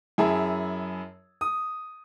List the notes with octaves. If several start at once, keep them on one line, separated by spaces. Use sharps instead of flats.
F#2 E4 G#4 A5
D#6